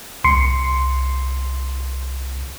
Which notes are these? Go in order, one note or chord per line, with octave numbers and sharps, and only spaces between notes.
C2 C6 C7 C#7